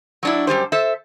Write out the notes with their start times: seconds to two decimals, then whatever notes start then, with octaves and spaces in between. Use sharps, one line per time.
0.23 F#3 D4 E4
0.47 F#2 G3 G4 C5
0.72 A4 C5 E5